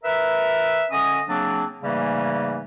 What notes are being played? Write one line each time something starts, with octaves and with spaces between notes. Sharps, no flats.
A#4 B4 E5
D3 C#4 D#5 D#6
C#3 F#3 A#3 C4 D4
G#2 C#3 E3 G3 A3 A#3